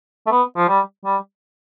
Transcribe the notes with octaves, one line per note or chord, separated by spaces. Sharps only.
A3
B3
F3
G3
G3